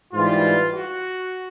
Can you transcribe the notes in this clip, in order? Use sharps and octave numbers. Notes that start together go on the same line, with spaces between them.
G#2 E3 G3 F4
F#4